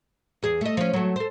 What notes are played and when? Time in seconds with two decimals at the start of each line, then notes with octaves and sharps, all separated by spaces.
0.43 E2 G#4
0.61 A3 D#5
0.77 F3 C#4
0.93 F#3 A3
1.16 A4 C5